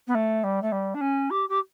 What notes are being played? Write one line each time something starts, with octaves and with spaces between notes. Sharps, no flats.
B3
A3
G3
A3
G3
D4
C#4
G4
G4